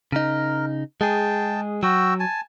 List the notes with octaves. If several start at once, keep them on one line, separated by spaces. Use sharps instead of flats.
C#3 D#4 A#4
G#3 G#4 G5 A5
F#3 F#4 G5 E6
G#5 A5